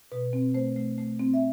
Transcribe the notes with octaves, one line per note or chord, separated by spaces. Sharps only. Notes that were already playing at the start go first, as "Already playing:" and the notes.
B2 B4
C4
A3 C5
A3
A3
C4
E5